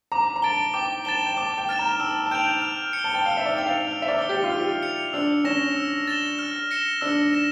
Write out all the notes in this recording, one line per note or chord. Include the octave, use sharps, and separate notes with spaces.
A#5 D6
A#5
A5 A6 D7 G7
G5 D6
A5 A6 E7 G7
G5
A5 D6
G5
F6 A6 E7
A#5
A5 E6
A5
G5 G6 D7 F7
F6
C#7
G7
A5
G5
F5 F6
E5
D5
G5 C#7 F7
F5
F6
E5
D5
C#7 G7
G4
F4
F6
G4
C#7 F7
D4 E6
C#4 A#6 E7 G7
E6
A6 E7 G7
F6
A#6 C#7 E7 G7
D4 E6
A#6 E7